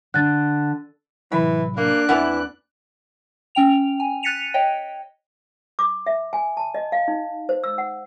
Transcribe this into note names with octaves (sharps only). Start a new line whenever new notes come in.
D3 F#6 A6
A2 C3 E3 F#3 B5
A#3 D4 F#6
D#2 E3 A3 B3 C4 E4
C#4 G5 F7
G#5
F#6 A6 B6 C#7 D#7 F7
C#5 D#5 G5
D6
E5
G#5
A5
D#5
F5
D#4
C5
E6
F#5